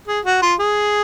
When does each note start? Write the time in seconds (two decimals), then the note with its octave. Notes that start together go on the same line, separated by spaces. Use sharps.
0.08 G#4
0.25 F#4
0.42 F4
0.60 G#4